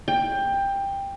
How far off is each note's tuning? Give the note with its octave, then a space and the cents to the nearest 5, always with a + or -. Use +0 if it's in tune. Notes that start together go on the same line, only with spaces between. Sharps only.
G5 +15